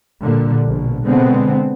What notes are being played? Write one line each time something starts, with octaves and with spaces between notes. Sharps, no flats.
A#2 D3 G3
A#1 B2
B2 D3 G#3 B3 C4